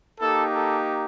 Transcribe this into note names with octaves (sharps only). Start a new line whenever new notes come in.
A#3 D#4 G4 A4
A4